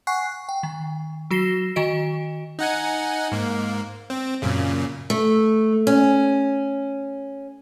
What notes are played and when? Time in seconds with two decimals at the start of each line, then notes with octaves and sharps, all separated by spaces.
0.07 F#5 G#5 C#6 F#6 C7
0.49 G5
0.63 D#3
1.31 F#3 F#4 A#6 C7 E7 G7
1.76 D#3 F#4 D#5 D7
2.59 D#4 F#5 G#5
3.32 G#2 A#3
4.10 C4
4.42 F#2 A#2 C#3
5.10 A3
5.87 C#4